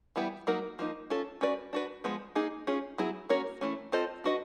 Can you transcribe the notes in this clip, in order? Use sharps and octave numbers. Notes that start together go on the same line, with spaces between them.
E3 G3 B3 E4 G4
F#3 A#3 D#4 F#4 A#4
F3 A#3 D#4
C#4 F4 A4
C#4 F#4 B4 D5
D4 F#4 B4
F3 G#3 B3
A#3 D#4 G#4
C#4 F4 G#4
F#3 B3 E4 G#4
A#3 C#4 F#4 A#4 C#5
E3 A3 C#4
C4 F4 A4 C5 D#5
D4 F#4 B4 D#5